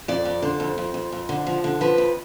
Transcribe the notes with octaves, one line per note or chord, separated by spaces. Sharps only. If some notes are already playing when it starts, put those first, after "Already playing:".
F2 D5
F2
D3 C5
F2
F2
F2
F2
D3
F3
D3
F3 B4
F2